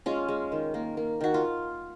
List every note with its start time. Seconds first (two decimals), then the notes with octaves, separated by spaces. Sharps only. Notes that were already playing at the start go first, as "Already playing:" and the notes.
0.06 G#3 C#4 F4
0.28 G#3
0.52 D#3
0.74 A#3
0.97 A#3
1.21 D#3 F#4
1.34 F4